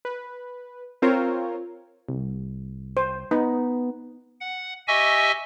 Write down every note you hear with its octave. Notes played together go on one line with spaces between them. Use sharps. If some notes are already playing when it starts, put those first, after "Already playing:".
B4
C4 F4 A#4 C5 C#5
C2
C5
B3 D#4
F#5
G4 D#5 E5 G#5 C#6 E6